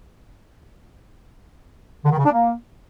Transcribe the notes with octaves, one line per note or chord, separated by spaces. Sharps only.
D3
D#3
C#3
D4
A#3